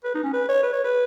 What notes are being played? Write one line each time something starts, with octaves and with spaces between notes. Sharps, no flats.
B4
D#4
C#4
B4
C#5
B4
C#5
B4